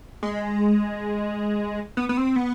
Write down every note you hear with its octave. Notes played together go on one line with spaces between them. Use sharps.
G#3
B3
B3
C4
B3